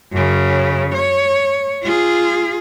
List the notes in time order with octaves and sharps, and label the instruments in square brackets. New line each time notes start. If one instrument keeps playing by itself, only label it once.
[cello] F#2 C#3
C#5
F4 G#4